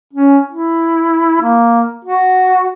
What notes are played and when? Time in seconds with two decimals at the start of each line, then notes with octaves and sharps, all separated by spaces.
0.13 C#4
0.50 E4
1.41 A#3
2.04 F#4